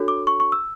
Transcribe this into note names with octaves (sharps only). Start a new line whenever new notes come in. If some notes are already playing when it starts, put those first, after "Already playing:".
Already playing: D4 F#4 A4 C#5
D6
C#6
C#6
E6